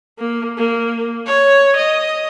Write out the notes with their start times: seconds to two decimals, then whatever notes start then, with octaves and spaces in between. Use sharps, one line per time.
0.19 A#3
0.57 A#3
1.26 C#5
1.77 D#5